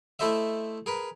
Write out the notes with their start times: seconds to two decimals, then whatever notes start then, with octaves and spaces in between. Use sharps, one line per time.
0.19 A3 E4 A4 C5 D#5 E5
0.86 G#4 A#4 B4